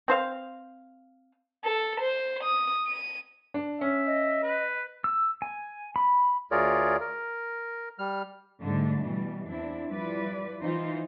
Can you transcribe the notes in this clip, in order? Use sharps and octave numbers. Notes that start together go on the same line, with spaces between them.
C4 C5 F5
A4
C5
D#6
D#7
D4
C#4 E5
D#5
B4
E6
G#5
B5
D2 F4 G#4 A#4 C#5 D5
A#4
G3 F6
G#2 D3 G3 A3 D4
B2 E3 G3
E2 C4 D4 E4
F3 G3 E4 B4 D5
E3 D#4 F4 C5